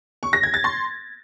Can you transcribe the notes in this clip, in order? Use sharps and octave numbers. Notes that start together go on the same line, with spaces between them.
C#6
A#6
G#6
A6
C6